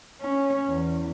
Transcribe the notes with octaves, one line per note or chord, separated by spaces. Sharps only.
C#4
E2